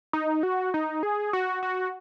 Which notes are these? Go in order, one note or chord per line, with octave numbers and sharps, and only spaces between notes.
D#4
F#4
D#4
G#4
F#4
F#4